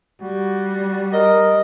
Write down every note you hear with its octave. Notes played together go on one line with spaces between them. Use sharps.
G3 F#4
A#4 D#5